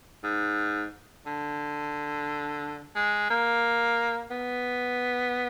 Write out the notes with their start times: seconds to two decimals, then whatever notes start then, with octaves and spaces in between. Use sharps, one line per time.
0.24 G#2
1.26 D3
2.96 G#3
3.30 A#3
4.31 B3